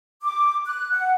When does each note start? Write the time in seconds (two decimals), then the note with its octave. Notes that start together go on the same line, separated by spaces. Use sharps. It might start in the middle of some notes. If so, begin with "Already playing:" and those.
0.23 D6
0.66 F#6
0.92 F#5